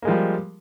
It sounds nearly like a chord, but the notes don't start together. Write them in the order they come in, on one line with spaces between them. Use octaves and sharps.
A#3 G#3 F3 G3